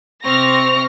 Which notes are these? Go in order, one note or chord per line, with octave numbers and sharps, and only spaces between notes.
C3 C4 C#6 F6 A#6